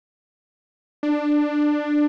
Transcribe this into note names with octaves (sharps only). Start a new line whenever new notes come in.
D4